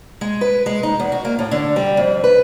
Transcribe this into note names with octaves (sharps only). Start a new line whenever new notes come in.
G#3
B4
G#3
D#4
E2
F#4
A#3
A2
D3
G3
F2
B4